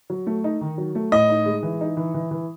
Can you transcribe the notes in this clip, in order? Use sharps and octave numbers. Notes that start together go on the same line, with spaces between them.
F#3
A3
D#4
D#3
F#3
A3
A2 D#5
D#4
G#3
E3
D#4
E3
E3
E3